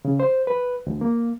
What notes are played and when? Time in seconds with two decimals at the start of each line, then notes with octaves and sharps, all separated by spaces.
0.05 C#3
0.20 C5
0.47 B4
0.87 D2
1.01 A#3